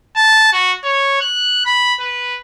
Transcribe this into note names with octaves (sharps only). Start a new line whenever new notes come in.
A5
F#4
C#5
F#6
B5
B4